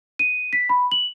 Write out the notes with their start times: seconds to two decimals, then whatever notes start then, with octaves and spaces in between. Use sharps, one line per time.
0.19 D#7
0.53 B6
0.69 B5
0.92 F#7